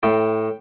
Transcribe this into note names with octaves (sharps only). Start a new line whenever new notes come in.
A2 G5